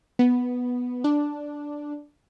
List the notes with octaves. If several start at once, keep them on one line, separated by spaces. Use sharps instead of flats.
B3
D4